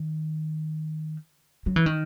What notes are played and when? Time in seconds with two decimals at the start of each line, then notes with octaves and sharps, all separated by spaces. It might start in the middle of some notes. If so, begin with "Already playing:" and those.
Already playing: D#3
1.66 F#3
1.76 E3
1.86 D#3